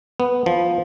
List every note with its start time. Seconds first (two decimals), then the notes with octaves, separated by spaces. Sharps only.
0.20 B3
0.46 F3